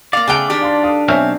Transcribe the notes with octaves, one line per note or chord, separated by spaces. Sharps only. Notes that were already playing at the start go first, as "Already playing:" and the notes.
A#3 D5 F5
C#3 A3 G#4 G5 F#6 F7
D#3 D4 G4
F5 C6
A4 F5 D#6
B1 C4 C#5 E5 F5 G#5